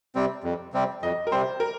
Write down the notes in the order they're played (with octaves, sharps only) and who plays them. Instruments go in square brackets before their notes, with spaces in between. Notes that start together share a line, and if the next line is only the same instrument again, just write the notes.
[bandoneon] C3 G3 C4
F2
C3 G3 C4
[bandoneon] F2 [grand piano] D#5
[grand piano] A#4
[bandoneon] C3 G3 C4 [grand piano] C5
[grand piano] A#4